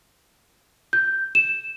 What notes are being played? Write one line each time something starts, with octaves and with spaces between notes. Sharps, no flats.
G6
E7